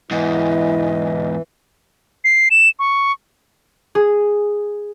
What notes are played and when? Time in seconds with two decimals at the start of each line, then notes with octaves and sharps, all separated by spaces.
0.11 E2 G#2 E3 E4 D#5
2.24 C7
2.51 E7
2.79 C#6
3.95 G#4